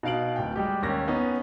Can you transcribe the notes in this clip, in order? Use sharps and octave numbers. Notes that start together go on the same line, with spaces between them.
B2 D#4 F5 D7 F#7
D1 G5
G3 G#3 G4
D#2 C#4 A#6
B3 C#4 D#4